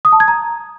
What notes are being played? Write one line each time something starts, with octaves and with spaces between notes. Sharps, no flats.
D#6
A5
G#6
A#5